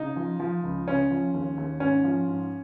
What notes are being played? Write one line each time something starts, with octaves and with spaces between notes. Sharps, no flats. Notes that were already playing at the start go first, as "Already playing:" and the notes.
Already playing: C#3 D#4
F3
F3
C#2
C#3 C#4
F3
D#2
D#2
G#2 C#4
F3
G#2